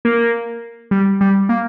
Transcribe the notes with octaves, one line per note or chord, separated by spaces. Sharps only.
A#3
G3
G3
A#3